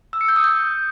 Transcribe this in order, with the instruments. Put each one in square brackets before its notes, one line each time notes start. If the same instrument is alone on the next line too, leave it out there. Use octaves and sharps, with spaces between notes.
[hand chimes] E6
C#7
G6
D#6
G6